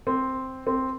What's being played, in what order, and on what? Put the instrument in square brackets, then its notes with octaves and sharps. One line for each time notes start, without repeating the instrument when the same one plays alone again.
[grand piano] C4
C4